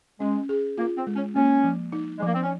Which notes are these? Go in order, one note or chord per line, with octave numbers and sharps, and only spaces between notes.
G#3 C#4
G#4
A#3 F4
C4
G#3
C#4
A#3 C#4
F3
D#4
G#3
F3 A#3
C4
C#4